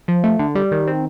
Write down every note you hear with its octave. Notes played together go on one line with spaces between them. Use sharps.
F3
A3
D3
G3
D#3
C4